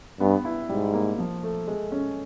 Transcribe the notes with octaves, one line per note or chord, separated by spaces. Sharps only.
G2 B3
E4
G#2 G3
A#3
F3
A3
G#3
C#4